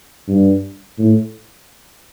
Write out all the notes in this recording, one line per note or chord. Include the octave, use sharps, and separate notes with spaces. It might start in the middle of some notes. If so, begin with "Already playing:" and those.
G2
A2